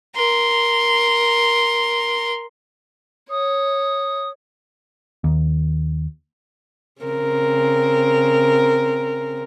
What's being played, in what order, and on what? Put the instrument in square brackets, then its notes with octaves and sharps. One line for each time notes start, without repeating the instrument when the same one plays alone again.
[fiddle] A#4 C6
[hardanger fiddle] C#5 [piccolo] D#6
[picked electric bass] D#2
[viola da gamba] C#3 C4 A#4